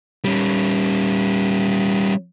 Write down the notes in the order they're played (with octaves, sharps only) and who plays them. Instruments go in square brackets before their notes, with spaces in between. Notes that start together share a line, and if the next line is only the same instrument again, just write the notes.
[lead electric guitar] G3 C#4